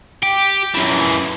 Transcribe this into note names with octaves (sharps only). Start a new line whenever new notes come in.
G4
F#2 E3